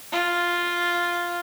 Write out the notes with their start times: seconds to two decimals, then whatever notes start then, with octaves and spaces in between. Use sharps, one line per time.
0.12 F4